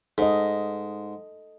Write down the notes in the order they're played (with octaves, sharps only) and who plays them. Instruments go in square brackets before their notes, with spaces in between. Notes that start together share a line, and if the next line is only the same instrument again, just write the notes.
[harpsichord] G#2 [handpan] A4 D#5